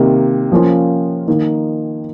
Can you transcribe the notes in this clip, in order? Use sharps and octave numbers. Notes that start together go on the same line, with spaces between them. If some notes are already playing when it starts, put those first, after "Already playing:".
Already playing: C3 D#3 A#3
F3 A#3 C#4 F4
D#3 A#3 D#4